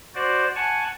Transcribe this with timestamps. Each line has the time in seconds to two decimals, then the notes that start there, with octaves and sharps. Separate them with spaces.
0.15 F#4 C5 D5
0.56 F#5 G#5 A5 C#6